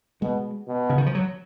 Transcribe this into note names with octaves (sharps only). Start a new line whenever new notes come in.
B2 G#3
B2
C#3
D#3
F3
F#3